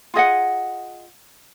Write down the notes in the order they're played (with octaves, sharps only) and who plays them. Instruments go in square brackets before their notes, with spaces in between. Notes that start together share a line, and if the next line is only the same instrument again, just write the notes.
[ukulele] F4 G#4 D#5 F#5